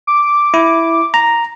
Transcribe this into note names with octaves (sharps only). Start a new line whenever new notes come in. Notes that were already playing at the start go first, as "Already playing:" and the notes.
D6
E4
A#5